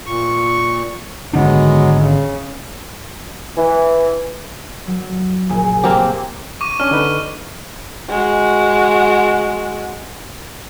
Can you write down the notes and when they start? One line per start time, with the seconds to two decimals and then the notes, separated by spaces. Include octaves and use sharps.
0.06 A#2 C#6
1.33 G#1 D3 F#3 G#3 B3 D4
1.98 C#3
3.57 E3
4.87 F#3
5.49 A#1 C#3 G#5
5.84 A#3 C4 G4
6.61 C#6 D6 D#7
6.80 C#4 D4 C#6 F6
6.91 D3 D#4 B4
8.09 G#3 F#4